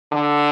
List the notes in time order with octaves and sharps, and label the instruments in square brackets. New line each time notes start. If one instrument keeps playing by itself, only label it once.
[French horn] D3